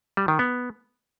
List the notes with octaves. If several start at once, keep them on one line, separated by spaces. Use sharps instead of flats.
G3
D#3
B3